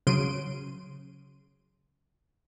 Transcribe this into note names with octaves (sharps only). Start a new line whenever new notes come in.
C#3 F#3 C6 D7 D#7